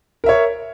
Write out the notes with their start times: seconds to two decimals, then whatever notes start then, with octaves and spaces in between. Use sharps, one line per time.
0.24 A#4
0.26 E5
0.29 C#5